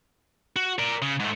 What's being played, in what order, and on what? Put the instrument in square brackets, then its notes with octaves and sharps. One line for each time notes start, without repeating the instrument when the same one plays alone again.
[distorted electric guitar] F#4
A#4 D5
C#3
G#2 A3